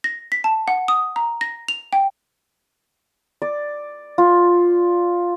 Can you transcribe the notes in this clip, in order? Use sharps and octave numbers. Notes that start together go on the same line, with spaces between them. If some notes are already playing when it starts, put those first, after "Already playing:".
A#6
B6
A5
F#5
D#6
A#5
A#6
F7
G5
D5
F4